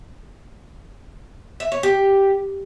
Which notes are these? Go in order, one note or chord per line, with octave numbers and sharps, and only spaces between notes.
E5
C#5
G4